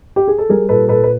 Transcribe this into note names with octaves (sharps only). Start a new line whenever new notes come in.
G4
G#4
A4
G3 G#4 A#4
A#2 A4 B4
A#2 A4 B4
B4